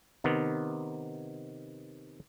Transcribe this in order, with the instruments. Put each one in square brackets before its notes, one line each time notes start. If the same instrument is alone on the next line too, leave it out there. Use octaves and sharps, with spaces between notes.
[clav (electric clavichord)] C3 D#3 B3